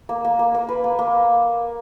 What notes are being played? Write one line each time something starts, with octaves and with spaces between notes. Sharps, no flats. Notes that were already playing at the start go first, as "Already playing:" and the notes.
A#3
A#3
A#3
A#3
B4
A#3
A#3